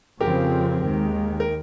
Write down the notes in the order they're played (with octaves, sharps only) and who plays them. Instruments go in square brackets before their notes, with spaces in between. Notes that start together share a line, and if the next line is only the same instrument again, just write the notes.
[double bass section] F2 C#3 F3 C4 [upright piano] G4 A#4
[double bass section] D#2 D#3 G#3
[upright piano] A#4